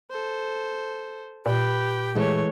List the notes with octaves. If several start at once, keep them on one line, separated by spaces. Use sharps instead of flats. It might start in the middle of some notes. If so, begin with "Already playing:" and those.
A4 C5
A#2 G4 B4 G5
E3 G#3 A3 C#5